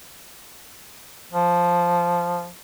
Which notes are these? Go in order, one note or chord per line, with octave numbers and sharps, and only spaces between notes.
F3